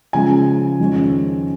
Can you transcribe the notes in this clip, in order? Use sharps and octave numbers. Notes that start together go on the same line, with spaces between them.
C#3 F3 G#3 C#4 G#5
F2 D#3 G#3 C#4